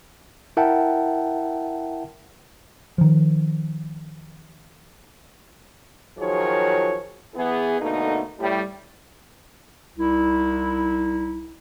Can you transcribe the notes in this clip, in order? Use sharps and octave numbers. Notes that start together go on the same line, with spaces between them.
E4 A#4 E5 F#5 G5 A5
D#3 F3
D#3 F3 F#3 F4 G#4 C#5
E3 B3 G#4
B2 D3 A3 A#3 D#4
A2 G3
C2 D#4 E4